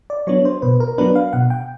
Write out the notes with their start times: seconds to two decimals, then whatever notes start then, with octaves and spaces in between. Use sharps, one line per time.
0.10 D5
0.27 F#3 B3 D4 C#5
0.45 C5
0.62 B2 B4
0.80 A#4
0.98 F#3 B3 D4 B4
1.16 F5
1.33 B2 F#5
1.50 G5